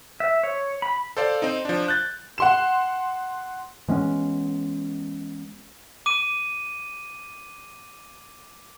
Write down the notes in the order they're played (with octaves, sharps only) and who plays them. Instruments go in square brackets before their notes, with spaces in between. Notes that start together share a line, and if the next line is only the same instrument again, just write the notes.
[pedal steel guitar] E5
C#5
B5
[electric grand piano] A4 C5 D5 F5
C4 D#4
F3 D4
F#6 G6 A6
[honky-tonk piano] F#5 C6 E7
[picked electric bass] E3 G#3 B3 C#4
[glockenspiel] D6 D#7